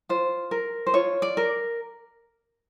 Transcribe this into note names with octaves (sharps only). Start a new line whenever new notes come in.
F4 C5
A#4
C5
F4 C#5
D5
A#4